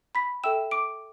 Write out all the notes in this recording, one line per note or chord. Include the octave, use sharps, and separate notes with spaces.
B5 B6
A4 E5 G5 E6 E7
D6 D7